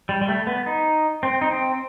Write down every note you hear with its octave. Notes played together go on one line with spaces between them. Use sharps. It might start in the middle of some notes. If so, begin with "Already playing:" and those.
G3
G3
A3
B3
D#4
C4
D#4
C4